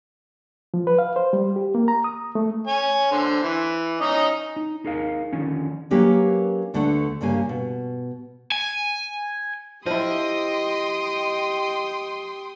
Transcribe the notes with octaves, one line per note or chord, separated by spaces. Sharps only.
F3
B4
F5
C5
G3
G4
A#3
A#5
D#6
A3
C#5 G#5
D3 C5
E3
C#4 D#4 D#5
D#4
D#4 G#4 A#4 F5
D3 D#3 F3 C#4
F#3 A#3 C#4 G4 A#4 B4
D2 D3 A3 B4 F#5
G2 C#3 A#3 G4 G#5
B2
G#5
F3 E4 G4 D#5 G5 C6 D#6